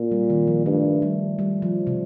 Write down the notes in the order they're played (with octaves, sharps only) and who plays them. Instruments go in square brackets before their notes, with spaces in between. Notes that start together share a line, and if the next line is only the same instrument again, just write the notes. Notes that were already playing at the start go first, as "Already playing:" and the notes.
Already playing: [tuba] A#2
[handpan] G3
D#3
F3
[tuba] G2 [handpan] A3
[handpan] G3
G3
F3
C3